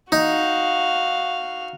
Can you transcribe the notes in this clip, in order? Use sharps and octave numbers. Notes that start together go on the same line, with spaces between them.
D#4 F#4 F5